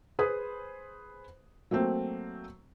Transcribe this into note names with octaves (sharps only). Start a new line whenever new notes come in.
G#4 B4 C5 B5 D#6
F#3 A3 A#3 C4